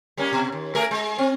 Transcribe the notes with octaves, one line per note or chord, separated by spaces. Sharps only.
G3 A#3 C#4
B2
D#2
A3 G#4 A#4
G#3
C4